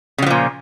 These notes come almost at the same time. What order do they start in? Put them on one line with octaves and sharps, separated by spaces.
C#3 F#3 F3 A#2